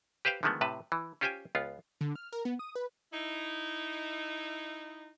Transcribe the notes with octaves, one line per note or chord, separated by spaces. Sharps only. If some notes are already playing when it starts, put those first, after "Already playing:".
G4 B4 C5 F5 G5
D3 D#3 F3 G#3 A3 B3
A2 C3 B4 A5
E3
C#4 F4 G4 C5 G5 G#5
C#2 B3 F4
D3
F6
A#4
B3
D#6
B4
D#4 E4